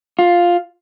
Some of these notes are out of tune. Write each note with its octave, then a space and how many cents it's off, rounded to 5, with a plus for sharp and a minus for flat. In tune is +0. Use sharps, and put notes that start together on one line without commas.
F4 +5